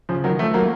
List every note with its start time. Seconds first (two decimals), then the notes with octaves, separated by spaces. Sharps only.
0.09 C#3 F3
0.24 D#3 F#3
0.39 F3 A3
0.54 F#3 A#3